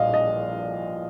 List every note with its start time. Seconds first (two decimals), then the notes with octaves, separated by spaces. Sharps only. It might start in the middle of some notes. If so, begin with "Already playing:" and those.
Already playing: A#1 A#2 G3 D4 D#5 F5
0.14 D#5